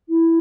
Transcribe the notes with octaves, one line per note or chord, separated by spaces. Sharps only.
E4